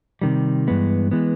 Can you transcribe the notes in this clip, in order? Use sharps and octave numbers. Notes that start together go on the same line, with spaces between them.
C3 D#3 G3
G2 E3 G#3 B3
E3 G#3 B3